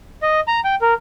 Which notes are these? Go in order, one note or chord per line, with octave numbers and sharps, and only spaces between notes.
D#5
A#5
G5
A#4